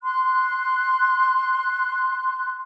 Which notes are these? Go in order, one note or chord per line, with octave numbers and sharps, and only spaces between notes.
C6 F#6